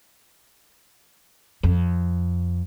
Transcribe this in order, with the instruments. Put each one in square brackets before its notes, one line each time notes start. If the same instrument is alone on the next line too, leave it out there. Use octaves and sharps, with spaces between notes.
[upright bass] F2